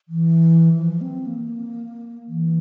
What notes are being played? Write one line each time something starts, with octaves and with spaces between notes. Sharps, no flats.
E3
F3
C4
A#3
E3